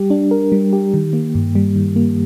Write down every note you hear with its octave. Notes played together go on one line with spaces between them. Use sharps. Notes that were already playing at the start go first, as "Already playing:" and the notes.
Already playing: G3 G4
D4
A#4
G3
G4
D#3
A#3
G2
G3
D#3
A#3